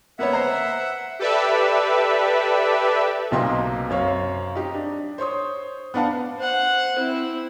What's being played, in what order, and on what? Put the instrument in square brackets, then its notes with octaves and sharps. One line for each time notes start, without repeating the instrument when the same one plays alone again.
[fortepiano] A#3 B3 C#5 [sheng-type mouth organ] E5 F#5
[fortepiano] C5 A#5
[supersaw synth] G4 A4 B4 D5 E5
[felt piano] B1 C3 A#3 D#5 G5 C6
F#2 C4 C#5 F5
D#4 G4 D#5
D4
C5 C#5 C6 D#6
B3 D4 F5 F#5 A5
[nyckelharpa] C5 F#5
C4 E4